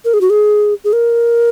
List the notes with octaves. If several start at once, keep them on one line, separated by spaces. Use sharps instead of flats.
A#4
G#4
F#4
G#4
G#4
A#4